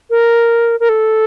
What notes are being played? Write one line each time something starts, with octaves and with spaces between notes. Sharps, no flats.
A#4
A#4
A4